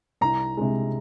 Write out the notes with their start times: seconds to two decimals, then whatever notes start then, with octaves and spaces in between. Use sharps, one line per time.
0.21 C2 A#5
0.57 C3 G#3